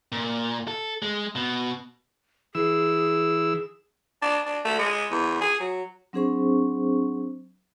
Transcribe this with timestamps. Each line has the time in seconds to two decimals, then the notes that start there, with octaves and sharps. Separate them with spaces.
0.12 A#2
0.68 A4
1.02 G#3
1.35 B2
2.55 E3 G#4 E6
4.22 D4
4.46 D4
4.65 A3
4.79 G#3
5.11 E2
5.41 G#4
5.60 F#3
6.13 F#3 C4 D4 G#4 C5 C#6